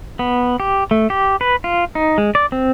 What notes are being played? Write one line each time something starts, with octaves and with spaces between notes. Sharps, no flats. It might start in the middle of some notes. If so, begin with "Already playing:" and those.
B3
G4
A3
G4
B4
F4
D#4
G#3
D5
C4